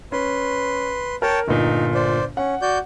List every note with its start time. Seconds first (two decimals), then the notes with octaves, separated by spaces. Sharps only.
0.12 C#4 B4 C6
1.22 A#4 C#5 G5 A5
1.48 G1 A#2 D#4
1.94 C5 D5
2.37 C#4 F#5
2.62 F#4 D5 G6